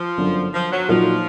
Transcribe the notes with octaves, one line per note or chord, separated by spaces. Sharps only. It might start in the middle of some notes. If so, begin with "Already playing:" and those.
Already playing: F3
G1 F#2 D3
F3
F#3
A#2 F3 F#3 A#3 D#4 F#4